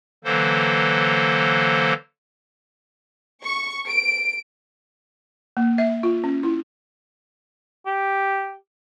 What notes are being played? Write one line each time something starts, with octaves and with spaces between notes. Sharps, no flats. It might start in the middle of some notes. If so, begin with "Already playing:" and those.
D3 E3 F#3 A#3 A4 C5
C#6
D7
A#3
E5
F4
C#4
E4
G4